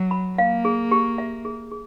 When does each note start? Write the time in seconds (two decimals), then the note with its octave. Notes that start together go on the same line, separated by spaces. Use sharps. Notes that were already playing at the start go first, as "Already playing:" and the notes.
Already playing: F#3
0.11 B5
0.38 A#3 F5
0.65 G#4
0.91 G4
1.18 E5
1.45 G#4
1.71 G#4